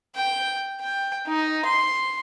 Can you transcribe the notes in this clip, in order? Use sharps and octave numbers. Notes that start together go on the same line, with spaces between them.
G5
G5
D#4
C6